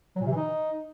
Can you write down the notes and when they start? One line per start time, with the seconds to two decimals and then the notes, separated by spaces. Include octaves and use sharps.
0.16 F#3
0.21 A#2
0.26 C3
0.31 E3
0.36 D#4